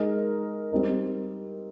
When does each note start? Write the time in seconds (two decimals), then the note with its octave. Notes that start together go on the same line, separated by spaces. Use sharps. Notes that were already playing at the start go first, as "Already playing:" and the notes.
Already playing: G#3 D#4 A#4
0.72 G3 C4 D#4 A#4